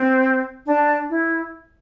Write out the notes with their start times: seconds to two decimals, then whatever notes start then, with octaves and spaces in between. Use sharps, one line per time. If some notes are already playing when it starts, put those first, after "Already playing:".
Already playing: C4
0.66 D4
1.10 E4